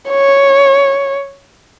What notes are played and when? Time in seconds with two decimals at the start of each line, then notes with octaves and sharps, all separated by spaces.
0.09 C#5